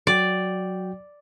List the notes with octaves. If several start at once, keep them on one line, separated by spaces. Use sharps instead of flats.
F#3 F#4 D5 G5